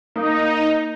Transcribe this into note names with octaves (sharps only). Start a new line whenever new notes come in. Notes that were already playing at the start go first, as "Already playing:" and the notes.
A#3 D#4